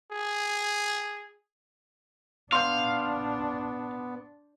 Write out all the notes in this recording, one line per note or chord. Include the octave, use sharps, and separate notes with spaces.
G#4
B3 D4 F5 C6 G6